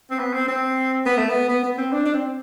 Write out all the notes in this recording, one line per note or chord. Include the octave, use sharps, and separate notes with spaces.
C4
B3
C4
C4
B3
A3
B3
B3
B3
C4
D4
D4
C4